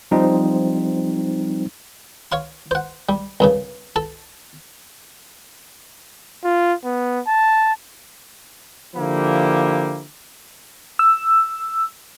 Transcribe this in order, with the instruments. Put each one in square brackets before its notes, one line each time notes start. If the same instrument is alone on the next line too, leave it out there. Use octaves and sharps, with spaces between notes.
[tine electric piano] F3 G3 C4 D#4
[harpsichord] C#5 F5 C6
C5 F#5
G3
C2 G2 C#3
A4 A5
[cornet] F4
B3
A5
[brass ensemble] D3 F3 A#3 E4 G4
[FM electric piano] E6